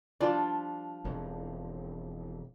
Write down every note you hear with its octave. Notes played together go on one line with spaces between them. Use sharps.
F3 G3 D4 F4 D5
E1 F2